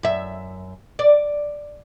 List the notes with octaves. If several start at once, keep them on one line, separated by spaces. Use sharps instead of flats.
F#2 E5
D5